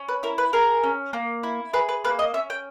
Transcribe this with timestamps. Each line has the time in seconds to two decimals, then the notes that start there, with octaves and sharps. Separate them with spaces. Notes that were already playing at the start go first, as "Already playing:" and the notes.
Already playing: C#4
0.09 B4
0.23 E4 A#4
0.38 B4
0.53 G#4 A#4
0.84 C#4
1.13 A#3
1.43 E4
1.74 G#4 B4
1.89 B4
2.04 A#3 B4
2.19 D#5
2.34 C#4 E5
2.50 G5